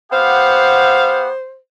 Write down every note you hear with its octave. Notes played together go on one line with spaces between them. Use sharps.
B3 G4 C5 F5 F#5